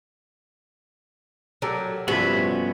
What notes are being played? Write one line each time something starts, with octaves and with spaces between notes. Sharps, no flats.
F#3 G4 A4 A#4
G2 C3 F3 B3 C#4 F#4 B4